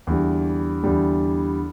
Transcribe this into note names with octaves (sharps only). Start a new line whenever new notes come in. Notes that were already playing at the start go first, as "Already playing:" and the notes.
E2 D3 G3
E2 D3 G3